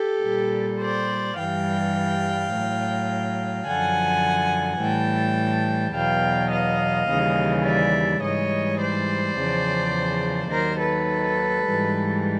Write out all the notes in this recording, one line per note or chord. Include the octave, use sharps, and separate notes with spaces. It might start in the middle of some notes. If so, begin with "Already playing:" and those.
Already playing: G4 A4
A#2 G3
C5 D5
G2 E3 G3 F5 G5
A2 F#3
F#2 D3 F3 F#5 G#5
A2 E3 G3 G5 A5
E2 B2 F#3 F5 G5
D#5 F5
D#2 C#3 E3 G3
D5 E5
G#2 E3 G3 C#5 D#5
C5 D5
E2 C#3 F3
D#2 D#3 F#3 A#4 C5
A4 B4
G#2 E3 G3